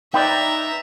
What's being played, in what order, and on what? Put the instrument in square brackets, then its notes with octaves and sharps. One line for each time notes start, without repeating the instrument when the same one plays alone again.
[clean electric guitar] D#4 B4 D5 [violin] E5 A#5 [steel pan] G5